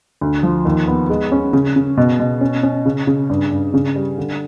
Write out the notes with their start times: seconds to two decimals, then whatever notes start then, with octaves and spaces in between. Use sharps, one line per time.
0.21 D2
0.43 F3
0.65 D#2
0.88 B3
1.09 G#3
1.32 C#4
1.53 C#3
1.76 C#3
1.97 B2
2.19 B2
2.41 C#4
2.63 C#4
2.85 C#3
3.07 C#3
3.30 G2
3.51 G2
3.74 C#3
3.96 G3
4.18 D3